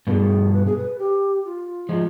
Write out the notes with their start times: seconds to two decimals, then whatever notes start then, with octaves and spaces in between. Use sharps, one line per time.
0.06 G2 B2 G#4 B4
0.53 B4
0.65 G#4
0.76 B4
0.98 G4
1.44 F4
1.89 F3 G#3